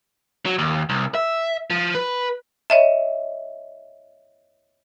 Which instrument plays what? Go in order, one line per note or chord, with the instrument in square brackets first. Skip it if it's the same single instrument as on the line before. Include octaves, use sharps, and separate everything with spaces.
[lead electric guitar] F#3
D#2
C2
E5
F3
B4
[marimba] C#5 D#5 E5